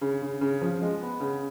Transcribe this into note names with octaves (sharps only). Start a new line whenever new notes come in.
C#3
C#3
C#3
F3
G#3
B3
C#3